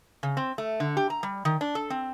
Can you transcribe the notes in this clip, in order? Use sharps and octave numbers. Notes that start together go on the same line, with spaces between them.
C#3
C4
A3
D3
G4
A#5
G3
D#3
D4
A4
C4